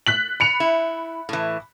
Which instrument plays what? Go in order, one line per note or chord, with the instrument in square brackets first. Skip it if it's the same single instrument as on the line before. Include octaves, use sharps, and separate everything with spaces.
[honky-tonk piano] F#6 B6 F#7
B5 C#7 F7
[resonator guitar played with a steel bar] E4
A2 E3